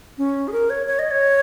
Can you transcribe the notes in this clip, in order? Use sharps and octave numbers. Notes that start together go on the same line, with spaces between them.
C#4
G#4
A#4
C#5
C#5
D#5
C#5